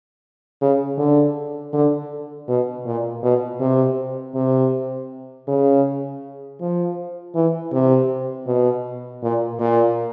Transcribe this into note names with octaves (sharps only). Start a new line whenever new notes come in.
C#3
D3
D3
B2
A#2
B2
C3
C3
C#3
F3
E3
C3
B2
A#2
A#2